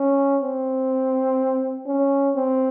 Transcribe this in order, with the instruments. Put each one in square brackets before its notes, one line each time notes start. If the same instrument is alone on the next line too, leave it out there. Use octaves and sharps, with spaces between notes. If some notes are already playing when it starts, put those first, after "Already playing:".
Already playing: [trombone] C#4
C4
C#4
C4